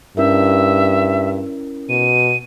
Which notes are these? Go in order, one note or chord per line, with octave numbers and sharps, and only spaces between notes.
G2 C#4 E4 A#4 E5
B2 D#7